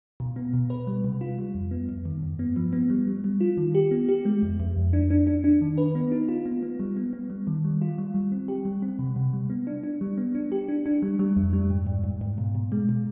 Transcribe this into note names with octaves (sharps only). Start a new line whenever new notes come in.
B2
B3
B2
B4
G3
C3
F4
G3
F2
B3
F2
D#3
G2
B3
F3
B3
G3
G3
G3
F4
D#3
G4
B3
G4
G#3
F2
F2
F2
D4
D4
D4
D4
D#3
B4
B3
D#4
F4
B3
B3
G3
B3
B3
G3
D#3
G3
F4
G3
G3
C4
G4
G3
C4
C3
C3
G3
B3
D4
D4
G3
B3
D4
G4
D4
D4
G3
G3
F2
G3
G#2
G#2
G#2
G#2
B2
B2
G#3
B2